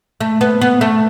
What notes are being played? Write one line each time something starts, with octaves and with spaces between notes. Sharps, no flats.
A3
B3
B3
A3